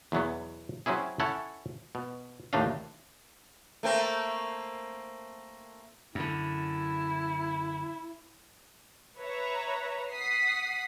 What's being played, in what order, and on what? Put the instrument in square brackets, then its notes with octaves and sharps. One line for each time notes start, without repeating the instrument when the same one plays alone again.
[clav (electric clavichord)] E2 B2 F#3 B3
F#3 C4 C#4 E4 G#4
C#4 E4 A4 C#5 F#5
B2
D#2 A2 A3 D4 D#5 F5
[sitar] A3 A#3 C4
[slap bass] F#2 D3 [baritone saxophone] E4
[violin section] B4 C#5 E5 A#5
F#5 D#6 B6 C7